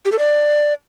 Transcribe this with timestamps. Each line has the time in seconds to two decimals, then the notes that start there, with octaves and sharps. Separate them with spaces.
0.05 G4
0.12 A4
0.19 D5